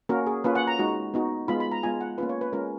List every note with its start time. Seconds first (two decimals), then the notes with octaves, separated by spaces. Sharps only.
0.09 A#3 C#4 F#4 A#4
0.27 G#4
0.44 A#3 C#4 F4 B4
0.55 F#5
0.67 A#5
0.79 G#3 D#4 F#4
1.14 B3 D#4 F#4
1.48 G#3 B3 F4 B5
1.60 B5
1.72 A#5
1.83 G#3 B3 F4 G#5
2.01 F#5
2.18 A#3 C#4 F4 B4
2.29 C#5
2.41 B4
2.53 G#3 C#4 F4 A#4